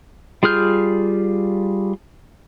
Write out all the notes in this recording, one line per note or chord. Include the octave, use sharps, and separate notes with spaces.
G3 F4 G#4 F6 G6